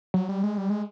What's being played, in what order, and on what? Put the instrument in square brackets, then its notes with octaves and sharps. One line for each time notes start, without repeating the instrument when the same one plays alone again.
[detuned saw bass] F#3
G3
G#3
G3
G#3